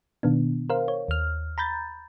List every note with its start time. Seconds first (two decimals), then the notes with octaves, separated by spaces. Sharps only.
0.23 B2 D#3 B3 D4
0.70 A#4 C5 F5
0.88 C#5
1.08 D#2 F6
1.58 A#5 B5 G6 A6